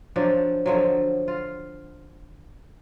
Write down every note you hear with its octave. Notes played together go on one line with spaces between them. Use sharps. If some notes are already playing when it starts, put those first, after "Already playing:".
F3 F#3 D4
D3 F3 F#3
F4